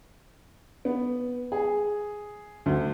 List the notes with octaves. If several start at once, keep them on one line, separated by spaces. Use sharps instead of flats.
B3
G#4
D2